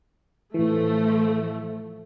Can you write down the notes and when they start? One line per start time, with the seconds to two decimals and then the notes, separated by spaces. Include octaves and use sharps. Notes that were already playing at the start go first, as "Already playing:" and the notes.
0.54 A2 E3 F3 A3